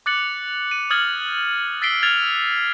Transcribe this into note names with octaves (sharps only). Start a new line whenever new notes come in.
D6 F#6 A6 C#7 F#7
D#7
D6 D#6 F6 G#6 A6 F#7
E6 A6 B6 C7 D7 G7
F6 G#6 A6 F7